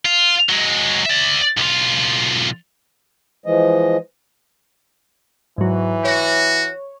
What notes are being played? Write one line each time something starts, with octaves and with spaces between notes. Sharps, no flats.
F4
F#3 G#3
D5 E5
B1 F4
E3 F3 G#3 D#5
G#2 E3 F#3
F#4 C#5